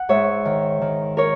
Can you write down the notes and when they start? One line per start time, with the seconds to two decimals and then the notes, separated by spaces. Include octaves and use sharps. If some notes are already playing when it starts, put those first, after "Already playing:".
Already playing: F#5
0.09 G#2 C#5 E5
0.45 D#3
0.81 D#3
1.17 A#4 C#5